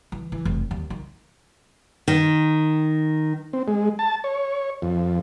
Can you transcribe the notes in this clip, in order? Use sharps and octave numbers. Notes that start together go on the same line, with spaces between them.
E3
E3
F1
D#2
D#3
D#3
C4
G#3
A5
C#5
F2